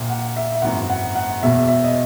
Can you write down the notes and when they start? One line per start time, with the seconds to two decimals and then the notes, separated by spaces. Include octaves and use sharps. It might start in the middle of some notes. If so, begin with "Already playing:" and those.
Already playing: A#1 A#2
0.10 F#5
0.36 E5
0.55 E5
0.62 G#1 F#2 E3 F#5
0.90 F#5
1.15 F#5
1.42 E1 E2 B2 E5
1.68 E5
1.84 D#5